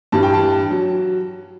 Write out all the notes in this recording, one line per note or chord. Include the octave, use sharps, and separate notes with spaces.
G2 E3 G3 A5
G5
A5
F#3